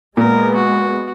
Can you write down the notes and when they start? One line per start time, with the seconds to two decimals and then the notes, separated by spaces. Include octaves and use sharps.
0.17 A#2 G#3 B3 A#4
0.56 F#4